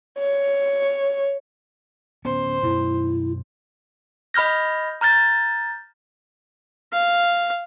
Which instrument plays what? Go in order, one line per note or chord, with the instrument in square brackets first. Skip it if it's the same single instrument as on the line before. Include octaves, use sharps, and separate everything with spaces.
[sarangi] C#5
[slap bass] D1 B3 C#4 [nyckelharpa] C5
[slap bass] F#2 B2 [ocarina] E4
[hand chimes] D#5 B5 F6 G6 A#6
A#5 F6 G6 A6
[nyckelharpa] F5